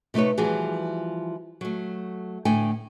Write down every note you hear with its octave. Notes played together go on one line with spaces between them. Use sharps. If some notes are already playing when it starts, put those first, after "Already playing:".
C3 A3 D#4 B4 C#5
E3 F3 G3 F#4 G#4
F#3 A3
A2 D3 A3 G5 G#5